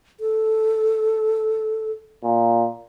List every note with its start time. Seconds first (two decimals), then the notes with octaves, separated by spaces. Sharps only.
0.20 A4
2.24 A#2